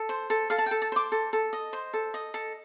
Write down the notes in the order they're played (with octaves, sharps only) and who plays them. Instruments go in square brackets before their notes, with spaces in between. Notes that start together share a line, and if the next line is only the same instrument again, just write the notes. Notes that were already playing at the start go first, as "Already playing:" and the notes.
Already playing: [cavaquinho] A4
C5
A4
A4 F5
A5
G5
A4
A5
C5 D6
A4
A4
D#5
C5
A4
D#5
A4